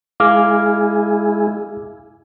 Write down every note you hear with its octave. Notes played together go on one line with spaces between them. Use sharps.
G#3 E4 G#4 F5 D6 F6